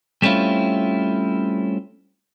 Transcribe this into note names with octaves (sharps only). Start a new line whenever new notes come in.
G3 A3 C4 C#4 E4 F4